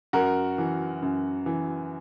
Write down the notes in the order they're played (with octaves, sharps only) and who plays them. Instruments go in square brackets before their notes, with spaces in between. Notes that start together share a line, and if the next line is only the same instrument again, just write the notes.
[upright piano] F#2 F#4 A#4
E3
F#2
E3